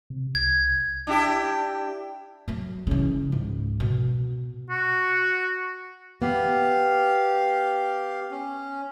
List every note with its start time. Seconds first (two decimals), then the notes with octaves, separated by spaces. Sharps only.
0.10 C3
0.35 C2 G#6
1.07 D4 E4 G4
2.48 F#3 A3
2.87 C#3 E3
3.32 C#2 G#2
3.80 B2
4.71 F#4
6.22 B3 G4 F5
8.31 C#4